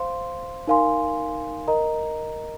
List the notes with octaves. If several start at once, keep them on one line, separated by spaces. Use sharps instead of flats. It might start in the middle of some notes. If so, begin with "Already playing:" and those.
Already playing: C5 F5 C6
D#4 A#4 F5 G#5 C6
A#4 D#5 A#5